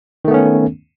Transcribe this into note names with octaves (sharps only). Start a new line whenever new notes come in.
D#3 A3 B3 C#4